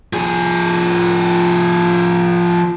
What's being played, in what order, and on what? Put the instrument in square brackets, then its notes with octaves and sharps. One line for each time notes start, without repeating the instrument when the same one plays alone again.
[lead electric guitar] F3 G#4